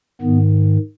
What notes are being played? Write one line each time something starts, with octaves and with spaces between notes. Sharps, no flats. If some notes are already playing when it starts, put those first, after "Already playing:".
G#2 D#3 B3